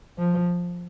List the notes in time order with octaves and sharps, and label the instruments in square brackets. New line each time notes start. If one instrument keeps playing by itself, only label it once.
[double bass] F3